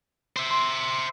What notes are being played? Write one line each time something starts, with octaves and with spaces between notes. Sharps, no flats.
C5 E5
C6